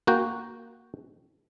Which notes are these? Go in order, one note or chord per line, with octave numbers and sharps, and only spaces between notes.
A#3 F#4 G5